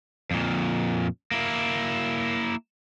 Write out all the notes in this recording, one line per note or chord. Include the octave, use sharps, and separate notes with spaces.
F2 A#2
A#3 E4